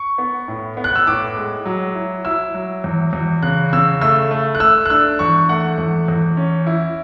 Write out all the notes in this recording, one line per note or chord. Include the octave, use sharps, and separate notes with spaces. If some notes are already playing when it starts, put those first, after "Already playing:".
Already playing: C#6
B3
A2
B3
F#6
E6
A2 D6
G#3
F#3
E4
E4 E6
F#3
E2
E2
C#3 F#6
C#3 E6
A3 E6
A3
F#6
A3 E6
F#6
D4 E6
E2 C#6
A3 F#5
E2
E2
C#4
E4